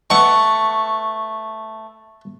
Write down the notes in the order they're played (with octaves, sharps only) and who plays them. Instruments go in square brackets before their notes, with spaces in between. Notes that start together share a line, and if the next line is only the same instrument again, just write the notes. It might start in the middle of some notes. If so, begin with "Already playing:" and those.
[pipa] A3 B3 F#5 [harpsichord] C#6